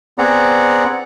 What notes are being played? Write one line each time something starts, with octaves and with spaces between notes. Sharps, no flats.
B3 C4 G#4 D5 F#5 A#5